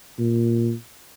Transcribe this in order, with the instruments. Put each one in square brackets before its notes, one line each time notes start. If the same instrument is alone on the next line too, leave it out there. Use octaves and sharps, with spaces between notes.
[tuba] A#2